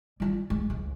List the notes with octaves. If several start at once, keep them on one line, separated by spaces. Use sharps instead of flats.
G3 F4
G#3
C#2 G#3